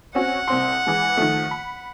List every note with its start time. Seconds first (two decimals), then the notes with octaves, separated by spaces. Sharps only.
0.15 C4 C#4 F#4 F#5
0.48 C2 C4 C6
0.86 E3 G#3
1.17 D#3 F3 A3
1.51 B5